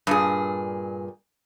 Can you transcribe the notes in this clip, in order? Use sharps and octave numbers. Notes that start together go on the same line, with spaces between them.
G2 A#2 G#4